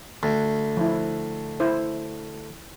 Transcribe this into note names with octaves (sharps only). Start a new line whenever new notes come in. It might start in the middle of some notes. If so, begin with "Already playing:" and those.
D2
F3 E4
E4 C5